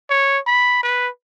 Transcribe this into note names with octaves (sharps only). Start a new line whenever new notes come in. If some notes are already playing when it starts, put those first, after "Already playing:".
C#5
B5
B4